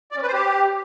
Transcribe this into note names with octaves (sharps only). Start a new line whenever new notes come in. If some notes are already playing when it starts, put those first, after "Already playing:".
D5
C#4
B4
C5
G4